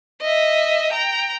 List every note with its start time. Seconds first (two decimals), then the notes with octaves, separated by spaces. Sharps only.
0.21 D#5 E5
0.92 G5 A#5